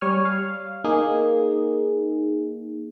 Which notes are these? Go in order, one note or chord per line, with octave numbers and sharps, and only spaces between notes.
G3 C#5 G#5 F6
F5
A#3 D#4 G#4